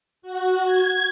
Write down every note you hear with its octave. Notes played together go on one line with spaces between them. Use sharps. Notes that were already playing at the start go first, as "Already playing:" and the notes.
F#4
G#6